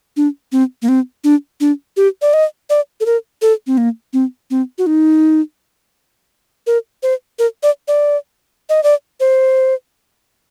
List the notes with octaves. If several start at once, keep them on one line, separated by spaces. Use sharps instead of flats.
D4
C4
A#3
C4
D4
D4
G4
D5
D#5
D5
A4
A#4
A4
C4
A#3
C4
C4
F#4
D#4
A#4
C5
A#4
D5
D5
D#5
D5
C5